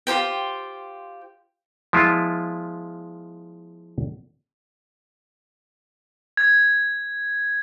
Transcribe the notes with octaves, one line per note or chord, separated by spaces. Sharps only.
F4 G4 C5 G5
F3 G#3 B3 E4 F4
G#6